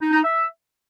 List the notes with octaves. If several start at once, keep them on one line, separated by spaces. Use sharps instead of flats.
D#4
D#4
E5